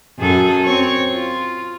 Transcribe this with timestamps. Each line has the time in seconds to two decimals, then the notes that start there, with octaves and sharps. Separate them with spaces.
0.19 F#2 G#4 A4
0.64 C4 C#5
1.12 F4